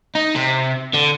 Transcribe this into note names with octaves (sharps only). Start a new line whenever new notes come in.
D#4
C3
D3